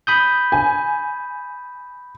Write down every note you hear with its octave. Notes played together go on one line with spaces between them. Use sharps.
B5 D#6 G6
G#5